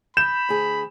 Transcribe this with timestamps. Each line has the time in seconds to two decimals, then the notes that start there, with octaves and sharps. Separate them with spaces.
0.17 B5 G6 E7
0.49 D2 G#4